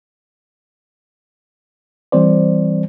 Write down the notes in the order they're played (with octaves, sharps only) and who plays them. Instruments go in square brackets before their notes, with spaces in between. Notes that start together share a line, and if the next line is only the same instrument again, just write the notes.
[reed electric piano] E3 G3 C4 C5 D5